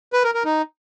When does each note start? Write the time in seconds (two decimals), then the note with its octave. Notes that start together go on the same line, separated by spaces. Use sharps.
0.13 B4
0.24 A#4
0.34 A#4
0.45 D#4